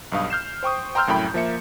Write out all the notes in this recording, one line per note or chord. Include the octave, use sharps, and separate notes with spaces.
B1 G2 F5 D#6
F6 G6 C7 E7
C5 G5 C#6 D#6
G5 A#5 C6 E6 F6 G6
C2 F#2 A2 G5 B5
F3 A#3 E5 C#7